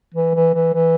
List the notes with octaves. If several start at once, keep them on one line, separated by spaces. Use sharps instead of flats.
E3
E3
E3
E3